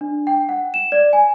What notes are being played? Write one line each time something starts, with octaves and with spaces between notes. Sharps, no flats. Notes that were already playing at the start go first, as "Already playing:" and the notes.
D4
G5
F#5
E7
D5
G#5